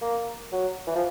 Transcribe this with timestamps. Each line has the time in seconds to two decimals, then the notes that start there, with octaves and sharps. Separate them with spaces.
0.02 A#3
0.52 F#3
0.87 E3
0.95 F3